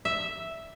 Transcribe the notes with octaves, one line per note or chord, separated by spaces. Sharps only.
E5